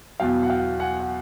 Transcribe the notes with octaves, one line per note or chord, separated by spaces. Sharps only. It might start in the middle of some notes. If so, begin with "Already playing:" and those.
E2 B2 F#3 F5 G5
F#5
F5 G5
F#5 G#5
F#5